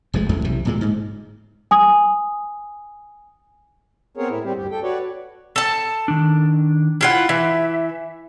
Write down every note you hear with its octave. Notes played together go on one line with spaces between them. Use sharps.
F1 F2 D3 G#3
A1 E2 A3
E1 B1 C3 E3
D1 A#2 G#3
G#2
G#5 D#6
B3 C4 G#4 A#4 C#5
A2 E4
G3 C4 G4
D2 G2 G4
A4 G5
F#4 B4 C#5 D5
A4 A5
D#3 D4
E4 F4 F#5
E3 E5